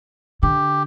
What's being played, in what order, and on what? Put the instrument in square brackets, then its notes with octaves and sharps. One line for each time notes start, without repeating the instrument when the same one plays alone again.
[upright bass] D3 [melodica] G4